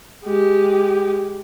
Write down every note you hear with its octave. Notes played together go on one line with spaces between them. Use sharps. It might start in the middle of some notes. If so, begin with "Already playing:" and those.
G#3 G4